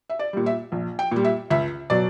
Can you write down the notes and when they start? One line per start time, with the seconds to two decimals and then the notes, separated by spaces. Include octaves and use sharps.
0.10 E5
0.19 D5
0.33 A#2 G3
0.46 E5
0.72 A#1
0.99 G5
1.11 A#2 G3
1.24 E5
1.51 C#2 E5
1.90 B2 F#3 D5